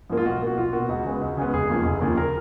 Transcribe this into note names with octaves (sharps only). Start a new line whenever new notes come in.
G#2 F3 A#3
F4
B1 F#4
B2 A#3 F#4
B1 F4
B2 A#3 F#4
C#2 F#4
C#3 G#3 B3
C#2
C#3 G#3 B3
F1 G#4
D#2 C#3 F3
F1
D#2 C#3 F3
A#4